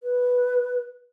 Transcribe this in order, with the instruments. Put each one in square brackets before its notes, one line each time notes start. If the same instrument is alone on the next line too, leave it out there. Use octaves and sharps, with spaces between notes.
[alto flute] B4